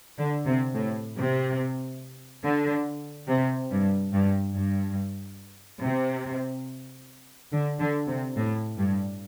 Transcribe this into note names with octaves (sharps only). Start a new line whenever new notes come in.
D3
C3
A2
C3
D3
C3
G2
G2
G2
C3
D3
D3
C3
A2
G2